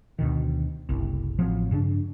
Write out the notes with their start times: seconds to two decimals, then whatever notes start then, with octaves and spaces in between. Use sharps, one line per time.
0.19 D2 B2 D#3
0.89 F#1 C2
1.39 A1 F3 F#3 C4
1.71 G2 C#3 C4 D4